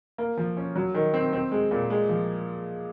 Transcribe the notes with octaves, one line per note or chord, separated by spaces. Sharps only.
A#3
F3
C#4
F#3
D#3
C4
C4
G#3
A#2
G#3
F3